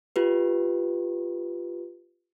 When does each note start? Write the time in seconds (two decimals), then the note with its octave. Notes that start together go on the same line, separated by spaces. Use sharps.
0.16 F4 G4 B4